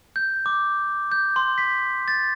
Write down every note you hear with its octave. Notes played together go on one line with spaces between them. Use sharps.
G6
D6
G6
C6
B6
A6